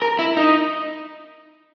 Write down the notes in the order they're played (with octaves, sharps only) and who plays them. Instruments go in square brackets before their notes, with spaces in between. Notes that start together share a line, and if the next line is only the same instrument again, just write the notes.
[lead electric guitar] A#4
E4
D#4